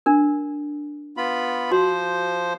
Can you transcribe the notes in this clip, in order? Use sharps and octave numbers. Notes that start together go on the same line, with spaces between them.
D4 A#4
B3 F4 B5
F3 F#4 C5 C6